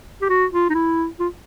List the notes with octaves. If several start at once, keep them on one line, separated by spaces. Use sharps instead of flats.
G4
F#4
F4
D#4
E4
F4